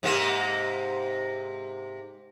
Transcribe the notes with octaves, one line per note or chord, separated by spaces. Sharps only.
G#2 C3 A#3